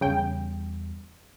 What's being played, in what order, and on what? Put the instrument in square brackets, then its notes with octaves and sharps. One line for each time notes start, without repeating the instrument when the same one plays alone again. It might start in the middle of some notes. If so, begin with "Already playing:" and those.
[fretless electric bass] E2 G3 [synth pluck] C#3 G5